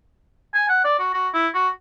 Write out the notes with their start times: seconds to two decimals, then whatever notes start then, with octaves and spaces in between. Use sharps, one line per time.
0.54 G#5
0.69 F#5
0.84 D5
0.99 F#4
1.14 F#4
1.34 E4
1.54 F#4